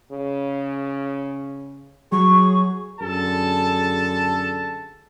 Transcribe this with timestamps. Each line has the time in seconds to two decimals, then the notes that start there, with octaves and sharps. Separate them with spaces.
0.12 C#3
2.12 F#3 G#4 C#6
3.01 F#2 D3 G#4 A4 A5